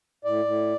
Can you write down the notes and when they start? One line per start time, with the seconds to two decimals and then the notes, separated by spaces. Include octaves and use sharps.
0.25 A2 D5
0.45 A2